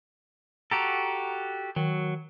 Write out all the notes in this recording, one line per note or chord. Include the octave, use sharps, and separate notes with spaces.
F#4 G4 A4 A#5
D#3 F#3